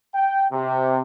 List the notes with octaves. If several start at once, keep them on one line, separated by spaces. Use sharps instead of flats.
G5
C3